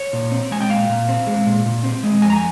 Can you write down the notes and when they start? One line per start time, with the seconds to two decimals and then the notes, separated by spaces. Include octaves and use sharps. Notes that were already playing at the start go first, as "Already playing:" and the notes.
Already playing: C#5
0.13 A#2
0.31 C4
0.51 G#3 G#5
0.60 G5
0.69 A#2 F5
0.89 A#2
1.08 C4
1.27 G#3
1.47 A#2
1.66 A#2
1.83 C4
2.03 G#3
2.22 F2 G#5
2.30 A#5
2.36 G#5